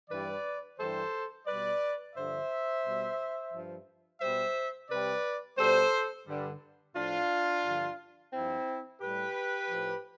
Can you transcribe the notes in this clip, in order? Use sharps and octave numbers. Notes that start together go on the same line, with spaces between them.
G2 E3 G3 B4 D5
G2 E3 G3 A4 C5
B2 G3 B4 D5
G2 D3 F3 C5 E5
B2 G3
G2 F3
B2 G3 C5 E5
C3 G3 B4 D5
B2 G3 A4 C5
G2 D3 G3
A2 F3 D4 F4
G2 D3 F3
G2 F3 C4 E4
A2 G3 G4 B4
A2 F3